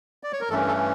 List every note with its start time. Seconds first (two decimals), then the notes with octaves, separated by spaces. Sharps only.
0.23 D5
0.33 C#5
0.41 A#4
0.50 G2 E3 A3 C#4 A4
0.67 A4